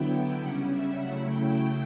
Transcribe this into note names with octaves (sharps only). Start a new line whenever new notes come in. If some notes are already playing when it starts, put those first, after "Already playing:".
Already playing: D3 F#3 B3 E4 G5
C#3 G3 C#4 F#5
E5
C#3 F#3 A3 E4 F#5
G5